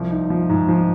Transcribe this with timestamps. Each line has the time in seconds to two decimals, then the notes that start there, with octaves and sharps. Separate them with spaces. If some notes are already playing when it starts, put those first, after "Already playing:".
Already playing: C2 F3
0.11 D#4
0.30 F3
0.49 G#2
0.69 F3